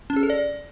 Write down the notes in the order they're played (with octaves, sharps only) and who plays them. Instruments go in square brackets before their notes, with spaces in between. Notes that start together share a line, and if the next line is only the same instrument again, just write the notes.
[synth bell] C#4
G#4
A4
D5